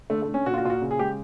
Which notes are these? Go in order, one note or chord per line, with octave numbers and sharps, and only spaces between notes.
D3 A3
A3
D3
C#4
A#2 F#4
F4
F#4
A#2 F4
F#4
C#3
G#4
G#3 G4